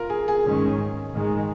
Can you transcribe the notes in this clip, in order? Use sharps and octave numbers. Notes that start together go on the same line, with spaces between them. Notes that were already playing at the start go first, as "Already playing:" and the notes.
Already playing: F4 A#4
G#4
G#4
G#2 D#3 G#3 C#4
G#2 D#3 G#3